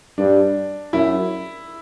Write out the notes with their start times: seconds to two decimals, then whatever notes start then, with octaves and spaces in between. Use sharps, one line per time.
0.18 G2 D4
0.93 F#2 E4